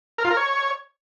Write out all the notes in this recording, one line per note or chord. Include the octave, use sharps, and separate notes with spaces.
A#4
F4
A#4
C#5